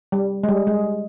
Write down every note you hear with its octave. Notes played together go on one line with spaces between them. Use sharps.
G3
G#3
G3
G#3